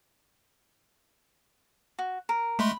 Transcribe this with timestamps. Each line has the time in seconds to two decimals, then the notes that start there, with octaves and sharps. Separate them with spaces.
1.99 F#4
2.29 A#4
2.59 G#3 A3 B5 C6